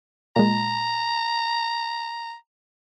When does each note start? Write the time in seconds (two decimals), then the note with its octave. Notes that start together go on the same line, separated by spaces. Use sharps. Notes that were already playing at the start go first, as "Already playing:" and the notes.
0.36 A#2 G#3 A#5